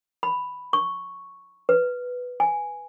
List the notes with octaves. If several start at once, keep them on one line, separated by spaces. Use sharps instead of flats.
B5
C#6
B4
G#5